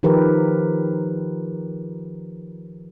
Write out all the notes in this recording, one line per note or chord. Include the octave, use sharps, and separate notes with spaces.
D#3 F3 G4 A#4 B4